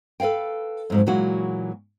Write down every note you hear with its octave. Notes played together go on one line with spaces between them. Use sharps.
A4 B4 D5 F5 G5
F2 G#2 F#3
A#2 E3 F#3 G#3 F#4